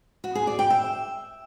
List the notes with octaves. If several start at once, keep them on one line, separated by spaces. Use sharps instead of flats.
F#4
G#4
D5
G5
E5